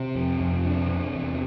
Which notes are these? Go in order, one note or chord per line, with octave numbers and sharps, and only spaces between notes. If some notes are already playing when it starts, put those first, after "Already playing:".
Already playing: C3
F2
F2
C3 D4
C3
E2